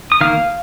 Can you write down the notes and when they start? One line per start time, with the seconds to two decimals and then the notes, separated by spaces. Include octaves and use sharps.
0.12 D#6
0.21 D#3 A#3 F5 F6